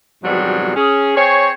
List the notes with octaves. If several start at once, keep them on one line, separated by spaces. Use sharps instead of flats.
F2 G#2 B2 D#3 F#3 G3
C#4 G#4
C4 G#4 C5 C#5